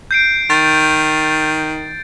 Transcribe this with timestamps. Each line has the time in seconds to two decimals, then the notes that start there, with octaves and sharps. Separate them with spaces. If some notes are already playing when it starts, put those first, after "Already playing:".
0.11 G6 C7 D7
0.50 D#3 A6